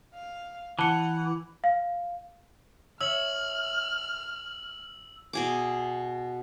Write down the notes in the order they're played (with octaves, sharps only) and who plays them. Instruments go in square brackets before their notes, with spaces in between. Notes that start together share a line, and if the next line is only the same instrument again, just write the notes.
[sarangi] F5
[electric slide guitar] E3 [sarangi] F#5 [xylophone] A5 C#7
[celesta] F5
[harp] C#5 E5 [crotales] E6 F#7 [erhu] F6
[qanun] B2 G#4 D6